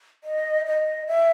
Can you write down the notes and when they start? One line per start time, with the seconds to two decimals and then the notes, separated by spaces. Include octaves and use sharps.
0.24 D#5
0.66 D#5
1.07 E5